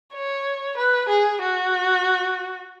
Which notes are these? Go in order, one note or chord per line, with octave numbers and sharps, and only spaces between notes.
C#5
B4
G#4
F#4